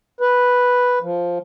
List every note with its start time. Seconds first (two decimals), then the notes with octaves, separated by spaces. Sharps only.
0.21 B4
1.02 F3